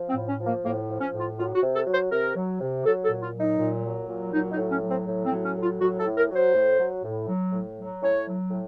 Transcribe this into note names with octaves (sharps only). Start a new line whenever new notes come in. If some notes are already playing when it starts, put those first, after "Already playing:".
Already playing: F3
C4
A2
C#4
F3
A#3
A2 A#3
F3
C#4
A2
F4
F#3 F4
F#4
C3
A4
F#3
C5
C3 A#4
F#3
C3
F#3 A4
A4
A#2
F4
F#3
D#4
A#2
F#3
A#2
F#3 D#4
D#4
A2
C#4
F#3
C4
A2
C4
F#3
C#4
A2
F4
F#3 F#4
A4
A2
A#4
F#3
C5
A2
F#3
A2
F#3
A2
F#3
A2 C#5
F#3
A2